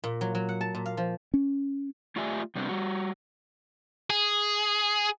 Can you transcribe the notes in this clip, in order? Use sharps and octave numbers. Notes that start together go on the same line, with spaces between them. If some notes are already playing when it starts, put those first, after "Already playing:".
A#2
F#3
F#3
F#5
A5
A#2
F5
F3
C#4
A3 F4 G4 D5 E5 G#5
C3 G3 B3 C4 D4
G3 F#4
G#4